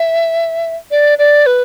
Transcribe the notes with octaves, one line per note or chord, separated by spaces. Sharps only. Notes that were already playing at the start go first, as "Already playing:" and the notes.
Already playing: E5
D5
D5
B4